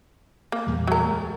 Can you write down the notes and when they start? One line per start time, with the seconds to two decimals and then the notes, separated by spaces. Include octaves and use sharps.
0.52 A#3
0.67 E2 A#2 G3
0.87 F#3 A#4
1.03 D2 G#3 A3